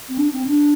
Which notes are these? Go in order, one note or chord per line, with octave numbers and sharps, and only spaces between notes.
C4
D4
C4
D4